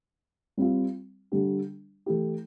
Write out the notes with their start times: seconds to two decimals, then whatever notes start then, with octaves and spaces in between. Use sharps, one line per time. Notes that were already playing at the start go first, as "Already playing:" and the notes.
0.57 G3 C4 F4
1.32 D3 G3 D4 G4
2.06 E3 A3 E4 G4